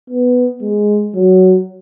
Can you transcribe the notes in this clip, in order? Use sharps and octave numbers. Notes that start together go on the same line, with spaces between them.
B3
G#3
F#3